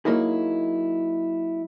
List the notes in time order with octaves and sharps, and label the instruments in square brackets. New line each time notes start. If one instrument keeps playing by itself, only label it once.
[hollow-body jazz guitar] F#3 A#3 D#4 E4 G#4